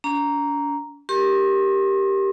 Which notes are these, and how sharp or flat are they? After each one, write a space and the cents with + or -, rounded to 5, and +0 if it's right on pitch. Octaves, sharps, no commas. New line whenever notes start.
D4 -45 A#5 +0
G4 +0 A#4 +0 C6 +40